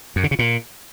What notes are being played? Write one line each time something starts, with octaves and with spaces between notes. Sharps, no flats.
F#2
D3
C#3
A#2